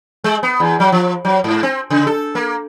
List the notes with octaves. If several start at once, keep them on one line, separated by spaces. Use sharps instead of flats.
G#3
B3
E2
F#3
F3
F#3
G#2
C4
C#3
A4
A#3